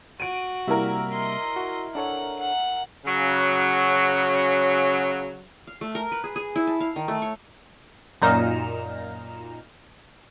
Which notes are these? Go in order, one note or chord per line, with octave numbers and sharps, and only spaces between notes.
F#4 D7 D#7
C3 G3 A#3 E4 A#4
D#5 C6
F#4
D4 A4 C#5 F#5
F#5
C#3 F#3
F5
A3
A#4
B4
G#4
G#4
E4
A5
F5
D#3
A3
C#5
F#2 A#2 D#4 A#5 F6 E7